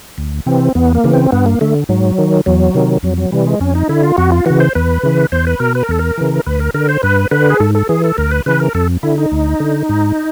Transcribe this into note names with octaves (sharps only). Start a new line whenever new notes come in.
D2
C3 E3 C4
E2 B3
A#3
C#3 E3
C4
G2 B3
A#3
D3 A3
G#2 F#3
D#3
E2 F#3
C3 D#3
F2 F#3
F#3
C3 E3 G3
G#3
F2 C#4
D#4
D3 E4
F4
F2 F#4
F4
C#3 E3 F#4
C5
E2 B4
C#3 E3
E2 C5
B4
B2 A#4
B4
A#4
E2 A4
A#4
C#3 E3
D2 B4
A#4
D3 A#4
C5
G2 B4
D3 B4
G#4
G#2 A4
A4
E3 G#4
A4
D2 A#4
B4
C#3 E3 B4
A#4
F2 A4
D3 E4
D#4
D2
D3
G#2